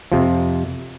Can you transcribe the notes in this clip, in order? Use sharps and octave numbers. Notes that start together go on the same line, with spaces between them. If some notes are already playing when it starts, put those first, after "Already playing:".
F2 C3 F3